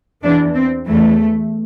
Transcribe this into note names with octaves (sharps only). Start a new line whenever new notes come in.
E2 E3 D4
C4
E2 E3 A3